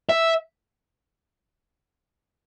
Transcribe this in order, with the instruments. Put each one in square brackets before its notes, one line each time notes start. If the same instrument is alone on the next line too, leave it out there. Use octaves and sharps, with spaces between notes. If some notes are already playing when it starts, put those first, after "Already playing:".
[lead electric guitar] E5